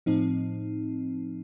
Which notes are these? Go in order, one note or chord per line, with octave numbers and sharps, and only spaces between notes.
A2 F3 C4 D#4